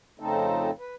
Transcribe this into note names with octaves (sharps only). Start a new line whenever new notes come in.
F2 C#3 A3 C4 D#4 A4
B4